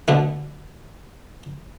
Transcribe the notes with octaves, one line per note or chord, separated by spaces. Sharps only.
B2 D3 A3